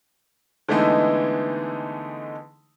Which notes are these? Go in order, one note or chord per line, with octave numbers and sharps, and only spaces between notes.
D3 E3 G#3 A3 B3 D#4